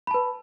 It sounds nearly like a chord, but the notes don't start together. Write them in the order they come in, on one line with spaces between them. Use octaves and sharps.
B5 A5 B4